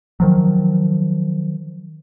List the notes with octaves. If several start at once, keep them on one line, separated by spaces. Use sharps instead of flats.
D#3 F3 F#3